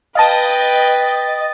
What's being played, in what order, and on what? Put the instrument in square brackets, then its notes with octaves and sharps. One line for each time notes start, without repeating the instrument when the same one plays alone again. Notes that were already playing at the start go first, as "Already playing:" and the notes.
[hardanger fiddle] B4 G5 [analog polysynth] D#5 A6 [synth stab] F5 A5